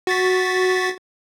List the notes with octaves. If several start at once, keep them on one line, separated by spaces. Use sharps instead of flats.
F#4 A6 B6